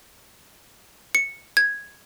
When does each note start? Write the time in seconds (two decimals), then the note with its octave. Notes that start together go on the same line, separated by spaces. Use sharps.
1.15 C#7
1.57 G#6